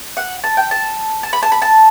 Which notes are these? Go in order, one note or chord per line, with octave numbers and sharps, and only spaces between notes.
F#5
A5
G5
A5
A5
B5
A5
B5
A5